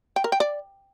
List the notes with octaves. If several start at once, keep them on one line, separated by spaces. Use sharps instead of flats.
G5
A#4
G5
D5